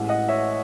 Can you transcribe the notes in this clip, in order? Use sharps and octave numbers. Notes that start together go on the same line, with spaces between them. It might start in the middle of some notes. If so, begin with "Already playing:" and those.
Already playing: A1 A2 E3 G#3
D#5 F#5
C#5 E5